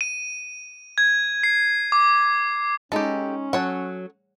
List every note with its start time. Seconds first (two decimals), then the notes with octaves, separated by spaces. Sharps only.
0.01 D#7
0.98 G#6
1.43 C7
1.92 D6
2.92 G#3 C#4 D#4 G4 A4
3.53 F#3 A4 C#5 F#5